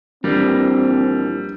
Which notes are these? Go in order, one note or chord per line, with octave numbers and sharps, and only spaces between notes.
A#1 E3 G3 A#3 C4